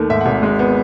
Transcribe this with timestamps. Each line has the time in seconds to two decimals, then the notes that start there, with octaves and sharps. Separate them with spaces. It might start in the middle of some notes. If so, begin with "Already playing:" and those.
Already playing: D#2 D#3 A3
0.09 G#2 E5
0.21 F#5
0.26 G#1
0.32 E5
0.43 G#3
0.59 B3